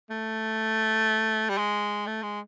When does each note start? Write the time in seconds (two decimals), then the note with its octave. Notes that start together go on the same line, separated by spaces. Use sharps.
0.10 A3
1.49 G3
1.58 G#3
2.07 A3
2.23 G#3